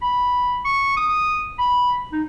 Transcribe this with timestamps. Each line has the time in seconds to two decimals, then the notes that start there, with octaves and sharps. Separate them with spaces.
0.02 B5
0.65 C#6
0.97 D#6
1.59 B5
2.12 D#4